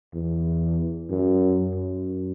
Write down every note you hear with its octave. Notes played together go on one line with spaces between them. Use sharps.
E2
F#2
F#2